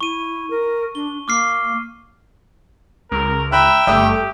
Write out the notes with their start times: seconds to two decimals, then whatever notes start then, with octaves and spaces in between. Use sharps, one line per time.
0.01 E4 C#6 D#7
0.50 A#4
0.95 D4 G7
1.28 A#3 D6 F6 C7
3.12 C#2 A#4
3.52 E5 G5 A#5 B5 F#6
3.87 G1 G3 A3 G4 E5 D#6 E6